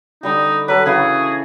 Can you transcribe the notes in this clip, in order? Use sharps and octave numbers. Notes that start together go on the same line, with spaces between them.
D3 G3 D#4 G4
F#3 A4 B4
C#3 E3 F#4 G#4